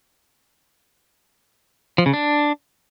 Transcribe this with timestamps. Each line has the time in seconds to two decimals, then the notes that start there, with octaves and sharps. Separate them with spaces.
1.98 F3
2.06 C#3
2.14 D4